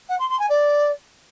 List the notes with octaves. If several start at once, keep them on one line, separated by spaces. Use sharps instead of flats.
F#5
C6
C6
G#5
D5